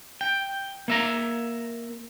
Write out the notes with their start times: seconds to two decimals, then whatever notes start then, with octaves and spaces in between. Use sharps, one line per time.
0.21 G5
0.88 A#3 E5 A#5